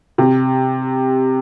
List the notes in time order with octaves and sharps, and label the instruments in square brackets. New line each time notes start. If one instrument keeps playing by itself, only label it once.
[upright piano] C3